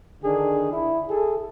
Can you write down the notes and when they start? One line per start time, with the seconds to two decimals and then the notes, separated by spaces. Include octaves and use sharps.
0.23 D3 D#3 D4 G#4
0.72 E4
1.09 G#4 A4